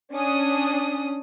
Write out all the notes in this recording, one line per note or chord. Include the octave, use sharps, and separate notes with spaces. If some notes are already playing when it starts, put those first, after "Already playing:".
C#4 D4 D#6